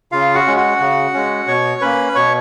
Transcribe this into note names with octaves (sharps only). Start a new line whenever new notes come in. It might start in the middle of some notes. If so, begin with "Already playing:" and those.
C#3 F4 F5
F#4 F#5
G#3 C#4
F#4 F#5
C#3
G#3 C#4
B2 C#5 C#6
A#3 C#4 B4 B5
B2 C#5 C#6